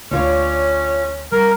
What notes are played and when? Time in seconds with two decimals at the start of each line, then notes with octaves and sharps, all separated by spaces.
0.11 D2 D3 C#4 D4 F4 C#5
1.32 G3 A#4